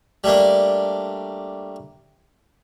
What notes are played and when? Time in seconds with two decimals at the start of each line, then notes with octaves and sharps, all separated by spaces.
0.24 G3 A3 A#3 D4